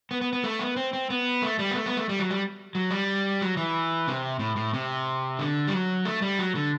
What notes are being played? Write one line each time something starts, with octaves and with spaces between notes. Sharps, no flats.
B3
B3
B3
A3
B3
C4
C4
B3
A3
G3
B3
A3
B3
A3
G3
F#3
G3
F#3
G3
F#3
E3
C3
A2
A2
C3
D3
G3
F#3
A3
G3
F#3
D3